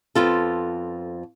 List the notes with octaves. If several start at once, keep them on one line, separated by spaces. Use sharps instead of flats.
F2 B3 F4 A4